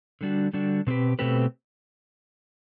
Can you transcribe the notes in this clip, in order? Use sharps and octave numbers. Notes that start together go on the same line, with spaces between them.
D3 G3 D4 F#4
D3 G3 D4 F#4
B2 A3 C4 G4 B4
B2 A3 C4 G4 B4